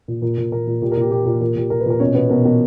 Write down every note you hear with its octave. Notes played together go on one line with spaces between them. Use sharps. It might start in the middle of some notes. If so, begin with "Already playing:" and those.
A#2
A#2 A#4
A#2
A#2 A#4
A#2
A#2 G4
A#4
A#2 G4
A#2 G4
A#2 A#4
A#2 A#4
A#2 G4
A#2 A#4
B4
A#2 A#4
B2 C#4 C#5
B2 B3 B4
B2 A#4
B2 A#4